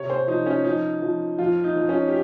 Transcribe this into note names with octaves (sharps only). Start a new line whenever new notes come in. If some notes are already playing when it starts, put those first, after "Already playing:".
Already playing: C3 C#5
C5
F3 D#4
C#4
F3 D#4
F3
F2 F4
D#4
F2
C#4
G4